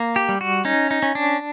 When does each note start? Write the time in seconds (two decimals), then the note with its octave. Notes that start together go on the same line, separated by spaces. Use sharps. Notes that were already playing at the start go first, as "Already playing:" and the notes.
Already playing: A#3
0.16 G4
0.29 G3
0.41 F#4
0.65 C#4 D#4
0.91 D#4
1.03 C#4
1.15 D4